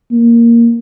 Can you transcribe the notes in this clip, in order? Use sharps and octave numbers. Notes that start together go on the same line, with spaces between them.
A#3